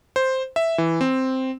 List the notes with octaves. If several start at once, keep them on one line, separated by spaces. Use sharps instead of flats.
C5
E5
E3
C4